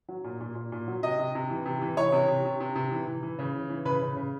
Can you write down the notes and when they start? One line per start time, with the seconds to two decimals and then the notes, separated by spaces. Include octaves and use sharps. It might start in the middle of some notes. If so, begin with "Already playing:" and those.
0.09 F#3
0.24 A#2
0.40 A#2
0.55 A#2
0.72 A#2
0.88 F#3
1.03 C3 D#5
1.19 C3
1.35 C3
1.50 E3
1.65 C3
1.81 E3
1.97 E3 C#5
2.12 C3
2.28 C3
2.45 C3
2.60 C3
2.75 C3
2.91 E3
3.07 E3
3.23 E3
3.39 C#3
3.54 E3
3.69 E3
3.85 C#3 B4
4.01 C#3
4.17 C#3